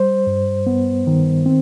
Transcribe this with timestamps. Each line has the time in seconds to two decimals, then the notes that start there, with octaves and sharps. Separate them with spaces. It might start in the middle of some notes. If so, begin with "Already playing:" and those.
Already playing: G3 C5
0.27 G2
0.67 B3
1.07 D#3
1.46 C4